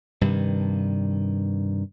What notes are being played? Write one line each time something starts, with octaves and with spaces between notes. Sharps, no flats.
G2 C3 D#3